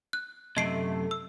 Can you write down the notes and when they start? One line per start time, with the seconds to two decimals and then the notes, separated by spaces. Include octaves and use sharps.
0.13 F#6
0.57 F#2 C3 A3 D#5 C7 D7
1.11 E6